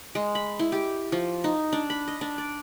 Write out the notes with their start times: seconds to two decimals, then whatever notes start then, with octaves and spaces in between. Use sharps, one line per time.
0.15 G#3
0.35 B5
0.59 E4
0.72 G4
1.12 F3
1.44 D#4
1.72 D4
1.90 B5
2.08 D#5
2.21 D4
2.38 D5